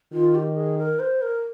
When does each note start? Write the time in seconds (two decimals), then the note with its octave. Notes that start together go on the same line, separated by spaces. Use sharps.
0.12 D#3 F4
0.35 G4
0.56 G#4
0.78 A#4
0.99 C5
1.22 A#4